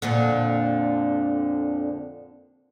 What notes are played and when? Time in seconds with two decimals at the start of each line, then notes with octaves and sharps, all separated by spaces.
0.02 F2 A#2 D3